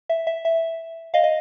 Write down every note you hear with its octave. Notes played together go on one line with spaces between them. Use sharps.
E5
E5
E5
D#5 F5
D#5